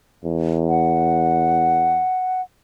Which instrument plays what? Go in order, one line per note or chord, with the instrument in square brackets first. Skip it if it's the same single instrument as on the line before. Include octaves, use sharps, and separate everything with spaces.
[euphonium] E2
[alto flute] F#5